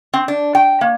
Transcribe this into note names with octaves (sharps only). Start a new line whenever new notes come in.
C4
D4
G5
A#3